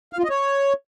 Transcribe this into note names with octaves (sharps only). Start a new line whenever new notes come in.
F5
F4
D#5
C#5